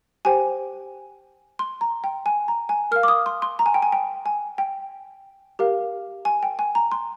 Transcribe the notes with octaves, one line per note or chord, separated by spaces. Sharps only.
G4 C5 G5 G#5
C6
A#5
G5
G#5
A#5
G#5
A#4 F5 F6
D6
D#6
C6
C6
A#5
G#5
G5
G#5
G5
G#5
G5
G4 A#4 F5
G#5
G5
G#5
A#5
C6